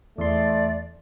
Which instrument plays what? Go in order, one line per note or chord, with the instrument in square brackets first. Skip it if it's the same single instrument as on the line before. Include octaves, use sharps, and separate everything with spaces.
[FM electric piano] E2 C6 [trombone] A3 [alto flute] D5